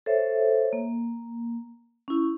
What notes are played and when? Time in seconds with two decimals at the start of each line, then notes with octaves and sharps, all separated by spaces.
0.06 A4 C5 C#5 E5
0.73 A#3
2.08 C#4 E4